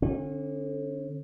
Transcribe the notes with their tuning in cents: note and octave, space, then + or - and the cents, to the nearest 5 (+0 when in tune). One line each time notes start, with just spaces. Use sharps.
D3 +0 C#4 -40